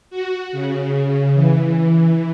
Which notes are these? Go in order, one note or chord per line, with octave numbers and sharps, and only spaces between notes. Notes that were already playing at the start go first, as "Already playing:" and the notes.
F#4
C#3
E3